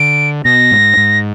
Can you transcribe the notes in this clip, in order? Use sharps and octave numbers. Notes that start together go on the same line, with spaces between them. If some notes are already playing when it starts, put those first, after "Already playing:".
Already playing: D3 D7
B2 A#6
G#2
G#2